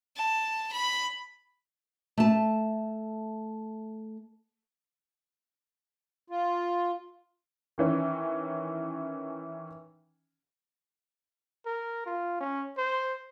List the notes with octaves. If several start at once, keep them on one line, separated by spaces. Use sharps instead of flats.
A5
B5
A3 A5
F4
D#3 E3 C#4
A#4
F4
C#4
C5